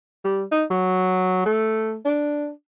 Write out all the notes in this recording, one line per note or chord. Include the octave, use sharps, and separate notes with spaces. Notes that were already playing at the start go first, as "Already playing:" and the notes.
G3
D#4
F#3
A3
D4